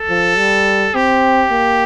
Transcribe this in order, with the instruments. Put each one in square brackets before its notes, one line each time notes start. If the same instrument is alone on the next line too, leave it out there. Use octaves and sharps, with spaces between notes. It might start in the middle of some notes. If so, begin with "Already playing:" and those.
Already playing: [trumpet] A4
[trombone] F3
G3
[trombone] C4 [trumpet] G4
[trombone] A#3